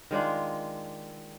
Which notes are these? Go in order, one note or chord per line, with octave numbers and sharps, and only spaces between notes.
D#3 G#3 D4 F4